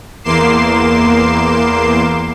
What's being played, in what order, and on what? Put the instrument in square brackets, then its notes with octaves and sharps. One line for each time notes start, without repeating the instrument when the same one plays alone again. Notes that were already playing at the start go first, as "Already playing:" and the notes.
[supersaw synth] E2 A#3 C6 D6 C7 E7